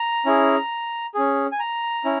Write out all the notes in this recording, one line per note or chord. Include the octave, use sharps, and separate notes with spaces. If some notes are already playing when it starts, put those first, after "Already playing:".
Already playing: A#5
C#4 E4 G#4
C#4 G#4
G#5
A#5
C#4 E4